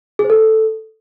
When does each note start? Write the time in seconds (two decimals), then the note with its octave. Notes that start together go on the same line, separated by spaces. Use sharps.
0.19 G#4
0.24 C5
0.30 A4